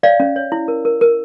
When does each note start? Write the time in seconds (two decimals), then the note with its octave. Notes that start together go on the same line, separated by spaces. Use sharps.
0.03 C#5 D5 F5
0.20 C#4
0.36 C#5
0.52 E4
0.68 A#4
0.85 A#4
1.01 A#4